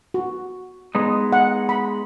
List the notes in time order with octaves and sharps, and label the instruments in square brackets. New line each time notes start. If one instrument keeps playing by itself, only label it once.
[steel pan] F#4
[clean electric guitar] G#3 B3 D#4
[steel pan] F#5
B5